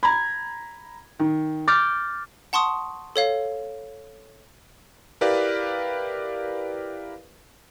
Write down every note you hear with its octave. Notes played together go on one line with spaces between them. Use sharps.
A#5 B5 G#6
D#3
D6 F6 G6 A6
F#5 A5 C6 C#6 D#6
A4 C#5 F5
E4 G4 A#4 B4 D5 F5